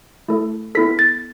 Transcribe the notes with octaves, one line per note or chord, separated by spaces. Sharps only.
A3 E4 A4
B3 E4 A4 B6
A6